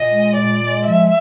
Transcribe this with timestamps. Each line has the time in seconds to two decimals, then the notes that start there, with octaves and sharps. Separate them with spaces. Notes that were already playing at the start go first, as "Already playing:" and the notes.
Already playing: A#2 D#5
0.12 G#3
0.36 A#2 D5
0.62 G#3
0.87 F3 E5